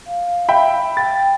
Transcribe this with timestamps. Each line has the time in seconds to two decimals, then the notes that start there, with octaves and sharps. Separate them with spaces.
0.06 F5
0.49 E5 G5 B5
0.97 G5 A6